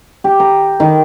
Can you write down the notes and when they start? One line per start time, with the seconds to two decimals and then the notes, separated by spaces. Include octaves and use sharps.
0.24 G4
0.40 A#5
0.80 D#3